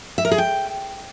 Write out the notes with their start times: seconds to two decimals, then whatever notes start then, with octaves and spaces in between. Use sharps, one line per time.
0.18 E5
0.25 A#4
0.32 G#4
0.38 G5